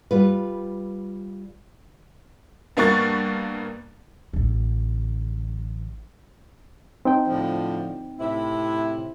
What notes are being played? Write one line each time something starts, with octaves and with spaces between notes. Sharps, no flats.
G3 F4 B4
G2 A#3 B3 C#6 F#6 A6
A1 D3
C4 D#4 G5
A2 D3 F3
A2 C3 E4